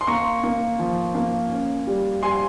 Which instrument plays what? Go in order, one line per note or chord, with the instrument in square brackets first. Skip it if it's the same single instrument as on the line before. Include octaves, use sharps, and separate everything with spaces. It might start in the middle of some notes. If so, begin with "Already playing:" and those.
[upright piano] C6
A#3 A#5 C#6
A#3
F3
A#3
C#4
G3
G3 G#5 C6